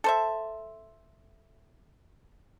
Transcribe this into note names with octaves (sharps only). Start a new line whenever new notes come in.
A4 C5 E5